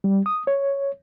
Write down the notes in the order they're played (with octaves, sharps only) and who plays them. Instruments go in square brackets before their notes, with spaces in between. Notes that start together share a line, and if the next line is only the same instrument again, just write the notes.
[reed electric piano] G3
D#6
C#5